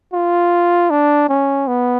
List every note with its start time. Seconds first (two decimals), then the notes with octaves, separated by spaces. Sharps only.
0.13 F4
0.90 D4
1.29 C#4
1.68 B3